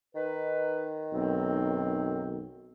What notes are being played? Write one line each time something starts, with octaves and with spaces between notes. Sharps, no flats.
D#3 D#4 B4
B1 F#2 C4